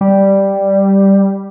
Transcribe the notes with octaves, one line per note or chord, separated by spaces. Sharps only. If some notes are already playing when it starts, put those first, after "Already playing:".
G3